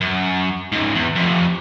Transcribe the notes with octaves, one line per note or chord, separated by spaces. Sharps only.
F#2
C#2 G#2
E2
F2 C3